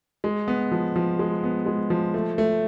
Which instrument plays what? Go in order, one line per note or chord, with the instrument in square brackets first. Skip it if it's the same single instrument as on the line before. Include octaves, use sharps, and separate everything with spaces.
[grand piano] G#3
B3
F3
F3
G#3
B3
G#3
F3
A3
A3